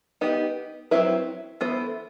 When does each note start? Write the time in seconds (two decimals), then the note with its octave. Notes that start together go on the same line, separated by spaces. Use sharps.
0.21 B3 D#4 G4
0.91 F#3 C4 E4 B4
1.61 E3 B3 E4 A4 C5